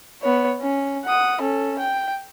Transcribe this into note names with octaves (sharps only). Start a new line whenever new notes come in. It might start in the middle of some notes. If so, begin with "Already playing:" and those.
B3 C#5
C#4
F#5 D#6
C#4 A4
G5